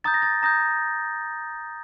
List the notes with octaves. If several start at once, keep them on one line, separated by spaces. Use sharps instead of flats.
A#5 D#6 G6 A6
A#6
A6
A#5 D#6 G6 A#6